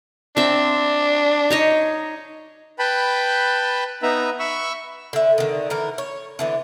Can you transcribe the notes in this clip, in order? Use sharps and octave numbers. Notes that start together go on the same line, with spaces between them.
C4 D4 E5
D#4 C#5 D#5
B4 G5 A5 B5
B3 D#4 B4 E5 A#5
E5 B5 C#6 E6
D3 E5
D3 D#3
D3 E3 A#4
C#5
D3 E3 B3